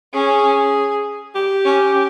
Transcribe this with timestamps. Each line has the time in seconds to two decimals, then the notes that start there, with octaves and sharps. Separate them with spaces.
0.14 C#4 G#4
1.35 G4
1.65 C#4